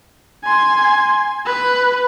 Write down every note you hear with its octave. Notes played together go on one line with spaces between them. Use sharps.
G#5 C6
B4